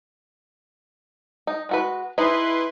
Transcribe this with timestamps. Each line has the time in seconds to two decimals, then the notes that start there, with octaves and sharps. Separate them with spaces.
1.47 D#4
1.69 G#3 F#4 B4
2.18 D#4 E4 G#4 B4 D#5 C6